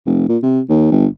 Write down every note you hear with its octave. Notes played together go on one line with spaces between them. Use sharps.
F1
A#2
C3
D#2
G1